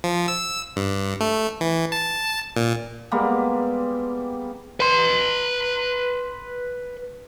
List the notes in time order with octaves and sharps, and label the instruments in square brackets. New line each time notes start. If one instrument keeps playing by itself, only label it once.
[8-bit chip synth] F3
E6
G2
A3
E3
A5
A#2
[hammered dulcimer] G3 G#3 A#3 B3
[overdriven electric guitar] B4 C6